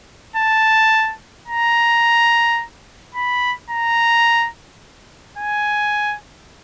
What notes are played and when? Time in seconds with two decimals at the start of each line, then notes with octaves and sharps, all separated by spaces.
0.36 A5
1.47 A#5
3.15 B5
3.70 A#5
5.38 G#5